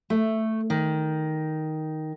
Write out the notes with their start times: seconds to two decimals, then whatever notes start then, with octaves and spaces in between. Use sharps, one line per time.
0.10 A3
0.70 D#3